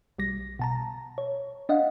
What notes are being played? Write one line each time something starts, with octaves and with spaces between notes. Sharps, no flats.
B1 G3 A#6
B2 A5 A#5
C#5
D4 D#5 F5 F#5